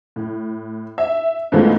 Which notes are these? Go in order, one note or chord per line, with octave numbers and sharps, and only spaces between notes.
A2
E5
G#2 E3 G#3 A3 B3 F4